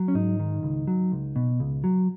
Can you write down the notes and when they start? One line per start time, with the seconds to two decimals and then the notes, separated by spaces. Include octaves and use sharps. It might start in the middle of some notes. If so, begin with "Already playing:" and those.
Already playing: F#3
0.08 C#4
0.14 G#2 D#4
0.39 D#3
0.63 C#2
0.88 F#3
1.12 C#2
1.36 B2
1.60 C#2
1.84 F#3